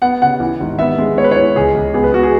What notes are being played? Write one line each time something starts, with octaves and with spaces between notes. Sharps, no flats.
B3 F#5
C#3 F#5
E3
G#1
B3 E5
G#3
B3 C#5
B4
E3 C#5
C#2 G#4
C#2
B3 G#4
B4
B3 F#4
G#4